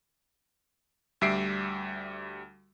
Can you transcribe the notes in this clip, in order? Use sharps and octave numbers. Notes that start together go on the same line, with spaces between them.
D2 G3 E5 C7 D7